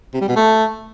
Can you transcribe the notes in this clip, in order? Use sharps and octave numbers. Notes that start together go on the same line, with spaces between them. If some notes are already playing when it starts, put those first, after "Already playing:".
C3
G3
B2
A3